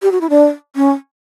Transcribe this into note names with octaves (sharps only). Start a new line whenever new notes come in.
G4
F#4
E4
D4
C#4